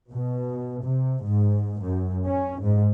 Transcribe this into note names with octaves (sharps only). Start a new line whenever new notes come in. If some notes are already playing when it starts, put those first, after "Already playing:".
B2
C3
G#2
F#2
C#4
G#2